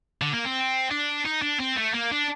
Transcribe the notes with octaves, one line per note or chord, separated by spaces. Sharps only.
D3
A#3
C4
D4
D#4
D4
C4
A3
A#3
D4